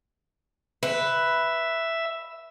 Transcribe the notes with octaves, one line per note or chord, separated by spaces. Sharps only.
B4 E5